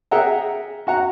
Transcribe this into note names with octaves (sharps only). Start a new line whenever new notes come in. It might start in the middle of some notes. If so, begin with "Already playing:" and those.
G#4 A#4 E5 F#5 G5 A#5
F#4 F#5 A#5